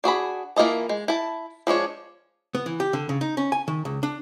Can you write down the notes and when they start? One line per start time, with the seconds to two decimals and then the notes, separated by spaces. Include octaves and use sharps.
0.04 D4 F#4 G#4 B5
0.56 E3 A#3 F4 D#5 A5
0.89 G#3
1.08 E4 A5
1.67 F3 G#3 D4 C#5
2.55 B3
2.66 E3
2.80 G4
2.93 D3
3.09 C#3
3.21 D#4
3.37 C#4
3.52 G#5
3.68 D#3
3.85 C#2
4.03 D4